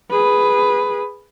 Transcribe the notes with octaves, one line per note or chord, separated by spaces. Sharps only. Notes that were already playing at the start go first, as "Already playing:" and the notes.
G#4 B4